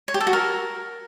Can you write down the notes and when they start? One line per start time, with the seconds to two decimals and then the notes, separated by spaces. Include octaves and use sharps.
0.08 C#5
0.14 G4
0.21 A4
0.27 F#4
0.33 A#4